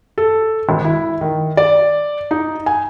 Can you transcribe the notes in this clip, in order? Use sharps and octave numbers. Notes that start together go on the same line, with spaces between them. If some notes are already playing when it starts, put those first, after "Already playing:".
A4
G#1
E4
D#3
D5
D#4
G#5